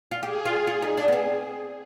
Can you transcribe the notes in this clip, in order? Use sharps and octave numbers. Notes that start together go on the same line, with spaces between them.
F4
G4 G#4
F4
F4
D#4
D4
B3
C4